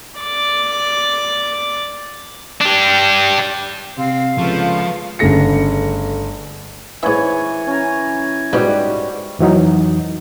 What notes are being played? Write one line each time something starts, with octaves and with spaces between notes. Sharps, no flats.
D5 D6
D4 G4
C3 C4 F5
C#2 F3 A3 B3 A4
G1 C#3 A3 A#6 C#7
G#2 E3 C#5 E5 G#5
C#4 A#5
E2 G#2 B2 G3 C#4 F#4 G4
F2 E3 F#3 D#4